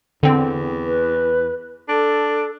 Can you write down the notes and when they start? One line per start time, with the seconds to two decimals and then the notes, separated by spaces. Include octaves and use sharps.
0.23 E2 D3 C4
0.86 B4
1.89 D4 A4